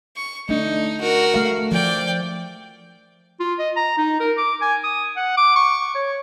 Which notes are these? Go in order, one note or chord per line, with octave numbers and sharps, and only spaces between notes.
C#6
A3 D4 D#4
F#4 A#4
A3 F5
F3 D5 G5
F4
D#5
A#5
D#4
A#4
D6
G#5
D#6
F#5
D6
C#6
C#5